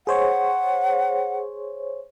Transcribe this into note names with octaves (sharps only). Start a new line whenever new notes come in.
G#4 C5 C#5 F#5